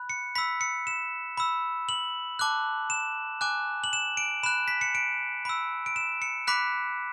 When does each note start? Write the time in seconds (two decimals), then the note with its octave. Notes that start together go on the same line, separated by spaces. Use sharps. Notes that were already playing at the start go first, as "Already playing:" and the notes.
Already playing: B5 F#6
0.10 C#7
0.35 B5 E6 B6
0.61 C#7
0.87 E7
1.38 B5 E6
1.89 F#7
2.39 A5 D6 F#6
2.90 E7
3.41 G#5 D6 F#6
3.84 F#7
3.93 E7
4.17 D7
4.43 B5 F#6 E7
4.68 B6
4.81 C#7
4.95 D7
5.45 B5 E6
5.86 D7
5.96 E7
6.22 C#7
6.47 B5 D6 F#6 B6